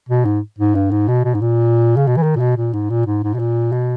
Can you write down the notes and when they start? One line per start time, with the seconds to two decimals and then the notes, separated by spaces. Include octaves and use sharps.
0.09 B2
0.25 G#2
0.58 G#2
0.75 G2
0.91 G#2
1.08 B2
1.25 B2
1.34 G#2
1.41 A#2
1.97 C#3
2.07 B2
2.17 E3
2.23 D#3
2.36 A#2
2.40 B2
2.57 A#2
2.73 G#2
2.90 A#2
3.07 G#2
3.23 G#2
3.34 B2
3.39 A#2
3.72 B2